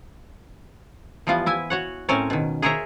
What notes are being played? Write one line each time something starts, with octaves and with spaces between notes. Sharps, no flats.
E3 F3 G3 B3 F4
E4 E5 G#5
F#4 C#5 F#5
A2 C4 C#4 A#4 C#5 G#5
B2 D#3
G#4 A#4 C5 C#5 E5 A#5